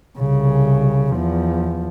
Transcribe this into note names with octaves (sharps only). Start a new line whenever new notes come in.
C2 C#3
E2 F3